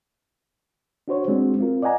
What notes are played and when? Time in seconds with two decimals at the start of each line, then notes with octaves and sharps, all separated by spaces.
1.08 D4 F#4 C5 C#5
1.28 G#3 C4 D4 F#4
1.59 C4 F4 A#4
1.82 D5 D#5 F#5 G#5 A#5